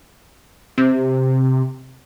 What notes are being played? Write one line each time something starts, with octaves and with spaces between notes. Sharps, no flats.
C3